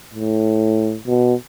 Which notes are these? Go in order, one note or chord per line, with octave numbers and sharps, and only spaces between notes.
A2
B2